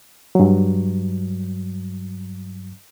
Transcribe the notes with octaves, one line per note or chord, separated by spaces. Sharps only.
G2 F#3